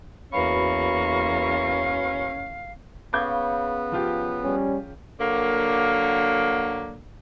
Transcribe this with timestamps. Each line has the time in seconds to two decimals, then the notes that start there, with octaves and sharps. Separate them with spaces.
0.32 E2 A#3 C#4 F#4 B4 F5 B5 C#6
3.13 C#3 B3 D6 G6 G#6
3.92 F3 F4 G4
4.43 G3 C#4
5.21 D3 F#3 A#3